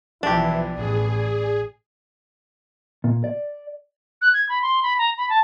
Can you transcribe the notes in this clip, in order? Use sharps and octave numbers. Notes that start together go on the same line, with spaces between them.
B1 E3 F3 D4 E4 G4
A1 G#4 D5
A#2
D5
F#6
G#6
B5
C6
B5
A#5
B5
A5